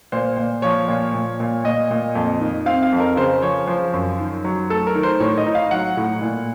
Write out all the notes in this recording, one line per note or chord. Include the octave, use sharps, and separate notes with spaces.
A#2 C5
A#2
F3 C#5
A#2
A#2
A#2
A#2 D#5
A#2
F2
D#3
C4 F5
F5
F2
A#4
C#3 C5
F3 C#5
F3 C5
F#2
D#3
F#3
A3 A4
A#4
D#3
C5
A2 C#5
D#5
D#4
F5
F#3 F#5
A2
A#2